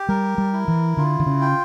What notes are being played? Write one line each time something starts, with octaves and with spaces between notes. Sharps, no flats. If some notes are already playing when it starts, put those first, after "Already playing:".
Already playing: G4
G3 A#4
G3
E4
E3
D3 F4
D3
C#3
G5